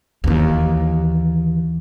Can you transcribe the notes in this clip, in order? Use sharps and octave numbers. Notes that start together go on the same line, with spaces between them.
D#2 E3